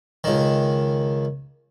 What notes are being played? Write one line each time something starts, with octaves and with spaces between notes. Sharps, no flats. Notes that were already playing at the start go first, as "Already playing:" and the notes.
C#2 D#3